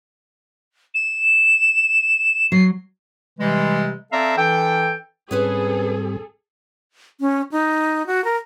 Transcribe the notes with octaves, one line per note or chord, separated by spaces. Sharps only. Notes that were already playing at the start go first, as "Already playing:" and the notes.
E7
F#3 C7
C3 E3 G3 G#3
C4 A4 D5 E5 F5 A#5
E3 D4 A4 G5
G#2 G3 C4 C#4 G#4 A4 B4 C5
C#4
D#4
F#4
A#4